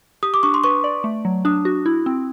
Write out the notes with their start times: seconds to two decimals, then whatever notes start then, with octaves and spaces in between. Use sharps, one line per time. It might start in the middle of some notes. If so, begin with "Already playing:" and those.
0.23 G4 D#6
0.34 D6
0.43 D4 C#6
0.54 C6
0.64 B4 C#6
0.84 D5
1.04 A3
1.25 F#3
1.45 D4 D#6
1.65 F#4
1.86 E4
2.06 C4